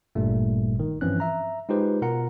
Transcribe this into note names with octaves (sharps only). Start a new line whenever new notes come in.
G#1 G2 A#2 G3 A3
G1 D#3
G2 E3 F3 C4 C#4 F#6
E5 A#5
G#3 D#4 F4 G4 B4 C5
B2 F4 A#4 F#5 A#5 C#7